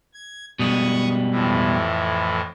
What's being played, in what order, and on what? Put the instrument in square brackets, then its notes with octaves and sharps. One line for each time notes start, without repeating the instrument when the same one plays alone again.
[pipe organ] G#6
[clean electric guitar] B2 G3 G#3 [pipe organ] C#6 D#6
[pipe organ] F2 A2 E3